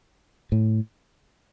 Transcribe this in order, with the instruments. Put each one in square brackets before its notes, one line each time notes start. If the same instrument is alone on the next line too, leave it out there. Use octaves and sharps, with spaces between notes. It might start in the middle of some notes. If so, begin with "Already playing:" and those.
[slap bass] A2